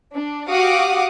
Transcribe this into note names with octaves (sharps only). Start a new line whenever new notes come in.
D4
F#4 G4 F5 F#5 D6 D#6